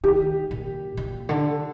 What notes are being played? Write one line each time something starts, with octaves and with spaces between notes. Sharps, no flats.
D#3 G4
A#2
A#2
D3